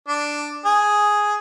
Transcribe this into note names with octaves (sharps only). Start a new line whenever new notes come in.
D4
G#4